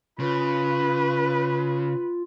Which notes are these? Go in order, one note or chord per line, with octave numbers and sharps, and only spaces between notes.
C#3 F4 B4